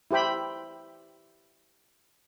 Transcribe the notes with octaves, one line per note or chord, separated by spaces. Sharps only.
E4 G4 C5 G5 B5